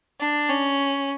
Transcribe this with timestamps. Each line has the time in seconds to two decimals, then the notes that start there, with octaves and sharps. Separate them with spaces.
0.21 D4
0.50 C#4